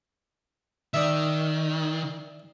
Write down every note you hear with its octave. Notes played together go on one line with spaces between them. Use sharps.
D#3 D5 E5